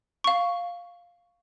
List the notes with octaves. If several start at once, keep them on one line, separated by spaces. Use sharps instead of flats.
F5 C#6